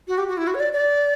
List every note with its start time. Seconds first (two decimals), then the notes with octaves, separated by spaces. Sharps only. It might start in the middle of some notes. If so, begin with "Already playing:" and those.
0.08 F#4
0.18 G4
0.28 F#4
0.37 E4
0.47 F#4
0.55 C#5
0.60 D5
0.73 D5